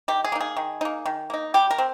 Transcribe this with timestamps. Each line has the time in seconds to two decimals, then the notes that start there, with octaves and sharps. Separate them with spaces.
0.08 D#3 G4
0.24 G#4
0.32 A#3 D#4
0.41 G#4
0.57 D#3
0.81 A#3 D#4
1.06 D#3
1.30 A#3 D#4
1.54 G3 G4
1.71 A#4
1.78 C4